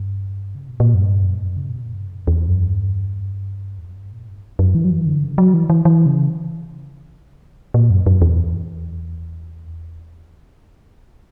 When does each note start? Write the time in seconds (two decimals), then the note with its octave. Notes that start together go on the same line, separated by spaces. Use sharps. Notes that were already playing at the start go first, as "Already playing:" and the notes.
Already playing: G2
0.55 C#3
0.68 B2
0.80 A#2
0.94 F#2
1.01 G2
1.22 F#2
1.37 G2
1.43 F#2
1.57 C#3
1.69 B2
1.81 A#2
1.94 G2
2.06 F#2
2.27 E2
2.48 F#2
2.70 G2
3.78 E2
3.87 F#2
3.96 G2
4.12 A#2
4.27 G2
4.59 F#2
4.75 E3
4.85 F#3
4.91 E3
5.06 D3
5.22 C#3
5.38 F#3
5.54 E3
5.70 E3
5.85 E3
6.06 C#3
7.74 A#2
7.90 F#2
8.06 F#2
8.22 E2